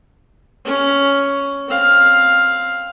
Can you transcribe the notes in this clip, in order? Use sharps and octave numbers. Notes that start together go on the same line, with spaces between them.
C#4
C4 F5